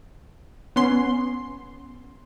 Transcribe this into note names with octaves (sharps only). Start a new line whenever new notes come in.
B3 C#4 C6